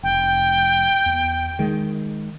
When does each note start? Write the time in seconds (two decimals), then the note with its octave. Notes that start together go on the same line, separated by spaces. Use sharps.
0.03 F1 G5
1.06 E2
1.59 D#3 G#3